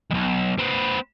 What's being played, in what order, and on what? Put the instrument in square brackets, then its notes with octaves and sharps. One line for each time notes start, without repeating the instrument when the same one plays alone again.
[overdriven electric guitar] B1 F2
C4 B4